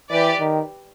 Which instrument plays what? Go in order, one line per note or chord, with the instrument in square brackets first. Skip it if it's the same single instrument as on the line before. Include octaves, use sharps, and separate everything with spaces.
[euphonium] E3 [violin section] G4 B4 D5
[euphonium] D#3